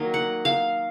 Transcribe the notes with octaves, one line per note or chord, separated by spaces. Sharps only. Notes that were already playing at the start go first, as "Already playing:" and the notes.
Already playing: D#3 F#3 A#3 D#5
F#5
F5